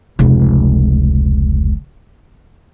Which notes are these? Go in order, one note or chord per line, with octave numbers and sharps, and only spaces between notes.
F1 C#2